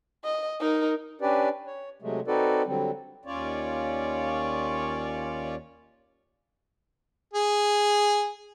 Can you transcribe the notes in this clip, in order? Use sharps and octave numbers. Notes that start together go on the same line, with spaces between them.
D#5
D#4 A#4
C#4 D4 G4 B4 D5
C#5
C3 F#3 G#3 A3
C4 D#4 F#4 A4 B4 D5
D3 F#3 G3 C4
D#2 C#4 F4 C#5 D5
G#4